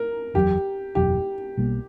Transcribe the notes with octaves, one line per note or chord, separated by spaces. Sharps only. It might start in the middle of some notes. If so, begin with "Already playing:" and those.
Already playing: A#4
F#1 E2 B2 F#3 G4
F#1 E2 B2 F#3 G4
B1 B2 G3 A#3